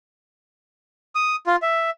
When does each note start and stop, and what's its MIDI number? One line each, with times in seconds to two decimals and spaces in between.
1.15 1.36 87
1.47 1.56 65
1.62 1.90 76